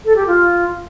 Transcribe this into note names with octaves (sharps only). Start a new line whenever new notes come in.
A4
G4
F4